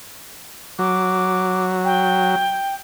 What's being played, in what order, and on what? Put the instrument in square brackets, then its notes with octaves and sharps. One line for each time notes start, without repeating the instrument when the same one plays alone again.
[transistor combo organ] F#3 [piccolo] D6
[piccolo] G5